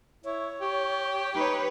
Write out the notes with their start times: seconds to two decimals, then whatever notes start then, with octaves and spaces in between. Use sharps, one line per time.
0.24 E4 C#5
0.61 G4
1.35 D#4 B4 C#5